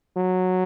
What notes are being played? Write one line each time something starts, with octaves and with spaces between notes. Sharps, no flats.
F#3